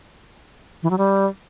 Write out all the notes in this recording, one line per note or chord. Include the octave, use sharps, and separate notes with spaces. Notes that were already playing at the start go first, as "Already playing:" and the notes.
E3
F#3
G3